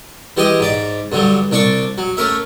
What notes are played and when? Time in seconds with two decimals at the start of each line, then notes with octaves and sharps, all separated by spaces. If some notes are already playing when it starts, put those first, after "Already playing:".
0.37 E3 G#3 G4 G#4 D#5
0.60 G#2 D5 A#5
1.12 G2 D3 F#3 G3
1.51 C2 D4 D5 A5 C#6
1.98 F#3
2.17 A3 C#4 A#4 E5